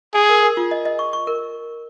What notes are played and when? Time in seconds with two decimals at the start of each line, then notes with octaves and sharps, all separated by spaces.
0.14 G#4 G#5
0.29 A#4
0.43 A#4
0.57 F4
0.71 D#5
0.85 D#5
0.99 C#6
1.13 C#6
1.27 A#4